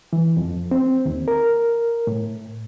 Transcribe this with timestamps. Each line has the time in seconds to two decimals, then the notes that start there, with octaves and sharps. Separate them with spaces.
0.13 E3
0.37 F2
0.71 C4
1.05 D#2
1.28 A#4
2.07 A2